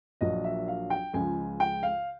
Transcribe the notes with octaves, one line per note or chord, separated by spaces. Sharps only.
A#1 A#2 F#3 D#5
E5
F5
G5
C#2 C#3 F3 G#3 G#5
G5
F5